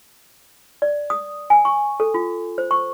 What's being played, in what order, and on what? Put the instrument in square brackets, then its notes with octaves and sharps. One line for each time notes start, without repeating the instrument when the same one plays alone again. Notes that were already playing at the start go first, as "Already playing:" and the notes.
[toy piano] D5
D#6
G#5
C#6
A4
F4
C5
C#6